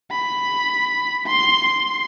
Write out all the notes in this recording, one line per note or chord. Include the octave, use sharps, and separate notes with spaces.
B5
C6
C6